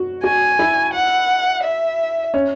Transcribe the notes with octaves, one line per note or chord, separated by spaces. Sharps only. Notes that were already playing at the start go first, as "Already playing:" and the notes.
Already playing: F#4
F#4 G#5
E4
F#5
E5
C#4